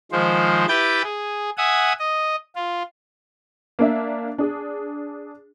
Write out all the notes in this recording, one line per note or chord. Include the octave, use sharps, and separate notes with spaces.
D#3 F3 G#3 C5
E4 G4 B4 G5 G6 A6
G#4
E5 F#5 G#5 D#6
D#5
F4
A#3 D4 E5
D4 G#4